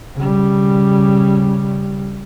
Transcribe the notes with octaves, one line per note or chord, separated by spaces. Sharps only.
C#3 G3